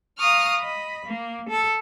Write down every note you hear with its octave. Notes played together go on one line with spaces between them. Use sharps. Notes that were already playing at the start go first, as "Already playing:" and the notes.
F5 A#5 C#6 D#6 F6
D#5 B5
A#3
A4